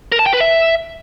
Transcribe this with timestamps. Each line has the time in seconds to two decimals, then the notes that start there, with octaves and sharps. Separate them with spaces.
0.12 A#4
0.19 A5
0.26 G5
0.33 B4
0.40 E5